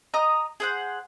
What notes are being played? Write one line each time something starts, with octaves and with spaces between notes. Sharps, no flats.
D#5 A#5 D#6
G#4 C5 F#5